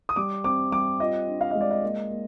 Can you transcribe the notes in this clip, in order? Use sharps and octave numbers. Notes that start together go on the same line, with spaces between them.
D#6
G3 D6
C4 D6
G3 D6
F4 D#5
D4
F5
G#3 D#5
D5
D#5
A#3
A#3